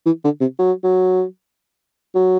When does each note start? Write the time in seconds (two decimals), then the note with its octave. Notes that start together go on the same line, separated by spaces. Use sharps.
0.06 E3
0.24 D3
0.41 C3
0.59 F#3
0.84 F#3
2.15 F#3